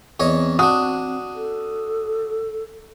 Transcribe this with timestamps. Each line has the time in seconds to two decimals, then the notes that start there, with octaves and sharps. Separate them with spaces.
0.20 E2 C4 C#5 D#5
0.59 D4 F#4 D#6
1.35 A4